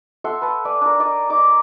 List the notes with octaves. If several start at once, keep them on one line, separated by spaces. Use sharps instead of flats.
A4 E5 F#5 C6
B4 A5
B4 D5 G#5
D4 A#4
D#4 D5 G#5
D#4 D6